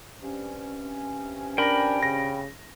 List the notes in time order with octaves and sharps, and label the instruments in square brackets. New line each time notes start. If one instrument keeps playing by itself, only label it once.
[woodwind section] G2 C3 C#4
[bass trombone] D4 [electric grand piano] A#4 A#6 [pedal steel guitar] G5 B5
[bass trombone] C#3 [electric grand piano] A#6